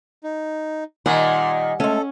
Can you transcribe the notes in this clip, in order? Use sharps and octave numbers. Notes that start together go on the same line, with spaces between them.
D#4
A#2 D#3 G3 F#5 G#5 C6
G#3 A3 C#4 A4